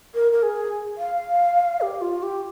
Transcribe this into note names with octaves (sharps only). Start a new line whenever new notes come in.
A#4
A#4
G#4
F5
G4
F4
G4